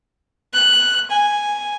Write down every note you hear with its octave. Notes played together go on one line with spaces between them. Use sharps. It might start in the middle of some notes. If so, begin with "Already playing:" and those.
F#6
G#5